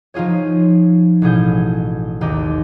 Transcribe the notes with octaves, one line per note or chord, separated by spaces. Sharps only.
F3 D#4 F4 G#4 C#5
A1 B2 G#4 G6
G#1 D#2 D#4 G4